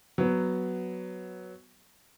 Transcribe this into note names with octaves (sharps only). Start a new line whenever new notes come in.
F#3 B3